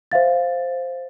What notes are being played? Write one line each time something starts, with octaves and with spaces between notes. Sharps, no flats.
C5 E5 F5 A6